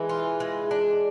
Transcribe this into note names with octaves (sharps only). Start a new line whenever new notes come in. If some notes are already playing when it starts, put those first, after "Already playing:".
Already playing: E3 G#3
F4
G#3
D4